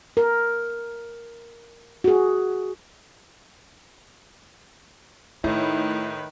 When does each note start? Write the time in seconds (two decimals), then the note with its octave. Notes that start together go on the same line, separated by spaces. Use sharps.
0.17 A#4
2.04 F#4 G#4
5.44 A2 D#3 D#4 E4 B4